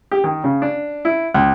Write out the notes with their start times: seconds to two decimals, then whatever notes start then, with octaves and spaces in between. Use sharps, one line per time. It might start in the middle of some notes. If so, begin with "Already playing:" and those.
0.12 G4
0.24 D#3
0.44 C#3
0.62 D4
1.05 E4
1.34 C#2